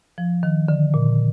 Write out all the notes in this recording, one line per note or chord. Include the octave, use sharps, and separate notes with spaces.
F3
D#3
D3
A#2